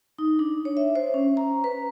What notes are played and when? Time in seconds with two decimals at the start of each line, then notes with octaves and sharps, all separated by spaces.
0.19 D#4
0.39 D4
0.65 C#5
0.77 E5
0.96 C5
1.14 C#4
1.37 A#5
1.64 B4